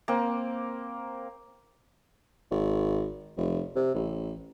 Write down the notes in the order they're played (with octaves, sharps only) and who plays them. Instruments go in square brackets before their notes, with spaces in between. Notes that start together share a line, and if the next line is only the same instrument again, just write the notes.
[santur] A#3 C4
[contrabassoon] G#1
F1
C3
A1